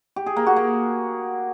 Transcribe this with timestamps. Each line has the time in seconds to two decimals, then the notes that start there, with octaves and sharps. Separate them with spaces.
0.16 G4
0.26 G#4
0.36 A#3
0.46 F#4
0.57 A#3